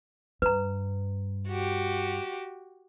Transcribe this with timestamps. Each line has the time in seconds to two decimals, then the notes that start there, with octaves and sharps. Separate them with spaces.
0.42 G2 B4 A#5
1.47 F#4 G4